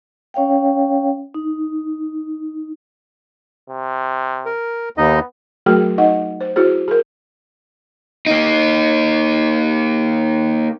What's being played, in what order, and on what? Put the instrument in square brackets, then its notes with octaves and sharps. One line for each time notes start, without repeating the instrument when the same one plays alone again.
[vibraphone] C#4 C#5 F5 G5
D#4
[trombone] C3
[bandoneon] A#4
[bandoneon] D#2 D#4 D#5 [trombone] B3
[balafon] F#3 A3 F#4 G#4 A#4 G5
D#4 D#5 F#5
C5
E4 F#4 G#4 C5
G#4 A#4
[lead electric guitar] A#3 D#4